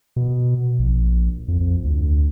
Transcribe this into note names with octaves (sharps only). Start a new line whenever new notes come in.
B2
A#1
F2
F2
D2